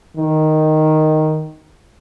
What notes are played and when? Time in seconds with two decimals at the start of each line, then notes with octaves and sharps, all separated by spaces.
0.17 D#3